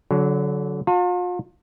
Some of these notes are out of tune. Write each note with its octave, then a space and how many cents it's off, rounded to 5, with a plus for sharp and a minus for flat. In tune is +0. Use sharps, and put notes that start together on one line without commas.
D3 -30 F#3 +0
F4 +40 A5 +40